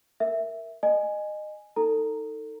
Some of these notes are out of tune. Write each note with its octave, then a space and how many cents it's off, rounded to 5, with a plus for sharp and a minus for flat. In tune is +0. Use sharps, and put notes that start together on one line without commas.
A#4 +0 E5 +0
D#5 -25 G#5 +0
D#4 +15 A4 +25 A#5 -5